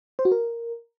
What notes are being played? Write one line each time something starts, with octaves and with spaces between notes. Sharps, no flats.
C5
F#4
A#4